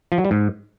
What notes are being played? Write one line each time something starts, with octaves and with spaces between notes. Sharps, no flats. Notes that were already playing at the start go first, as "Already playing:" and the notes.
F3
F#3
G3
G#2